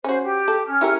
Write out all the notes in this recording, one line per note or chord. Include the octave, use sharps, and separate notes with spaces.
C#4 F#4 C5
G4
A4
C#4 F6
E4 G4 A#4